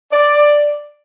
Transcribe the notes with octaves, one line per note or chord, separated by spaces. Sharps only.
D5